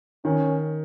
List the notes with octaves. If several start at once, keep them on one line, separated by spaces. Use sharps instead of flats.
D#3 C#4